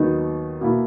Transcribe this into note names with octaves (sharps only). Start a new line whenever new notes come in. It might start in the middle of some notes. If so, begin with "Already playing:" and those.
Already playing: D#2 D#3 F#3 B3 D#4
B2 A#3 E4